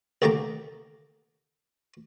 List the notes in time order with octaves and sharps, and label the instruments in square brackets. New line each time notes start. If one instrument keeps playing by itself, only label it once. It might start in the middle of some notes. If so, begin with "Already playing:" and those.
[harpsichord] C2 D3 A3 A#3 G4 A#5